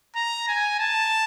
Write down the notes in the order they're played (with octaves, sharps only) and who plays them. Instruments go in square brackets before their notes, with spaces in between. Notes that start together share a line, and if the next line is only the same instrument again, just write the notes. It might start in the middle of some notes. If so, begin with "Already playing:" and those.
[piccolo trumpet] A#5
G#5
A5